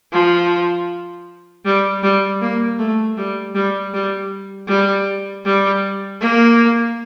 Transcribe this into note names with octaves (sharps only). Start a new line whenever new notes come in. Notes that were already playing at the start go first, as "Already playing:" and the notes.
F3
G3
G3
A#3
A3
G3
G3
G3
G3
G3
A#3